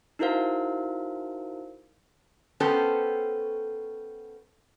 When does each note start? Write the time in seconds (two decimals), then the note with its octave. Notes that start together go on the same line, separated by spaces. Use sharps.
0.19 D#4 E4 F#4 A#4 C5 F5
2.60 B3 C#4 G4 A4 C5